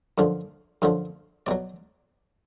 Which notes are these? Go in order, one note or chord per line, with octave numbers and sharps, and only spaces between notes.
F#2 D3 F3
F#2 D3 F3
B2 F#3 D5